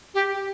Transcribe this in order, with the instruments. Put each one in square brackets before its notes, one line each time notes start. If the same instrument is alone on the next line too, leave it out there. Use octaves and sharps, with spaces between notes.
[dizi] G4